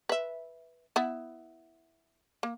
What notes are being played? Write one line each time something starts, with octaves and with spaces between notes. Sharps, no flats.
B4 E5
B3 E4
A#3